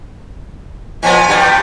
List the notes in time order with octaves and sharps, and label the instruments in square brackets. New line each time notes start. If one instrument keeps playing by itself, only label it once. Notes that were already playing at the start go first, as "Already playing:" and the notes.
[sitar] A#2 F3 B3 [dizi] G#5
[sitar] G2 G3
[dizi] G5